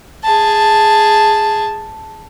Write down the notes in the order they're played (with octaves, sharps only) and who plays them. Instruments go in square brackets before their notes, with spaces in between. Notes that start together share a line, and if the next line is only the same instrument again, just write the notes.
[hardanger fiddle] G#4 A5